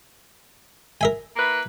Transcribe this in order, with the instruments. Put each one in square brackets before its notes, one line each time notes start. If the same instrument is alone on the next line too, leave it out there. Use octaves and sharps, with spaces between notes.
[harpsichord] A#4 E5 G#5
[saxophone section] A#3 E4 B4